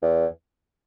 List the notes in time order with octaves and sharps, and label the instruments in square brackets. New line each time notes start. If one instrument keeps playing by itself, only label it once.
[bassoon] E2